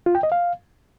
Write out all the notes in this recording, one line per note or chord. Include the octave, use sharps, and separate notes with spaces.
F4
G5
D#5
F5